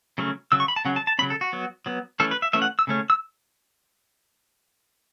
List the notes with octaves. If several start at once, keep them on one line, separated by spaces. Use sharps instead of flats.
C#3 F#3 A3 C#4
C#3 F#3 E6
C#6
B5
A5
C#3 F#3 C#4 F#5
A5
A5
C#3 F#3 C#4 B5
A4
F#4
F#3 B3
F#3 B3
E3 A3 C#4 A4
B4
E5
E3 A3 C#4 E5
F#5
E6
C#3 A3 C#4
E6